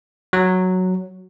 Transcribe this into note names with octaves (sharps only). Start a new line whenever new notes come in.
F#3